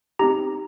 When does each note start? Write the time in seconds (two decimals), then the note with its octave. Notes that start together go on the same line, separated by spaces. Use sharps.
0.19 C4 D#4 G4 A#5